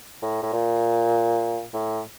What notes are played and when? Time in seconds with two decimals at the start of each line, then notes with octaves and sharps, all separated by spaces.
0.22 A2
0.43 A2
0.53 A#2
1.73 A2